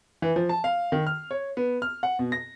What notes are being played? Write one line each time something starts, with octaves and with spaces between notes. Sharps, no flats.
E3
F3
A5
F5
D#3
F6
C#5
B3
F6
F#5
B2
A#6